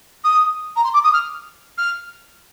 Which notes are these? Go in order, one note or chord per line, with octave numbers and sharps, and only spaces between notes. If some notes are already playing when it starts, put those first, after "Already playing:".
D#6
A#5
C6
D6
D#6
F6
F6